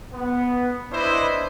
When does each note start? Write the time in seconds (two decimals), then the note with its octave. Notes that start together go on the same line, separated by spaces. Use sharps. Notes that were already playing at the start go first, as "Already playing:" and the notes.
0.13 B3
0.91 D4 E4 B4 C5 D#5